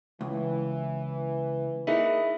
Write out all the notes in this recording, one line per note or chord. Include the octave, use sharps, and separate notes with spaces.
C#2 E3
A#3 D#4 E4 G#4 E5